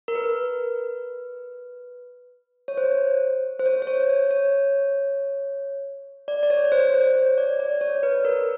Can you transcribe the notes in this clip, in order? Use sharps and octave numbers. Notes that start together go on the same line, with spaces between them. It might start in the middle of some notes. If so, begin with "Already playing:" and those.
A#4
B4
C#5
C5
C5
C#5
C5
C#5
C#5
C#5
D5
D5
C#5
C5
C5
C#5
D5
D5
C#5
B4
A#4